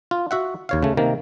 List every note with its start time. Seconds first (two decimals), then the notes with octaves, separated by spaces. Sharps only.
0.11 F4
0.31 F#4 E5 F#5
0.69 D#2 C#5 F5
0.83 C#3 A3
0.97 C3 D#3 A#3